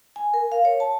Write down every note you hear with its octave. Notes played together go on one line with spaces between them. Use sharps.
G#5
A#4
F5
C#5
A5